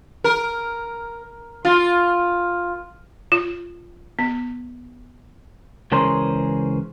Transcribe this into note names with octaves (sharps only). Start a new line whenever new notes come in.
A#4
F4
F4
B3
C#2 E3 C#4 G#4 A#4 C5